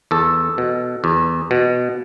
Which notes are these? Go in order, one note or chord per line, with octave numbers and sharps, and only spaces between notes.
E2 A4
B2
E2
B2